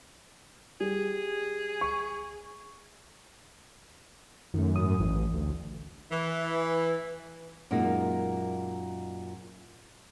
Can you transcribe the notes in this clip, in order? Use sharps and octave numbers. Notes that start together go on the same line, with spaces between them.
G3 G#4
C#6
F#2 D#3 A3
G#2 D#6
A1 E3
D2
E3
F#2 A#2 G#3 A#3 D#4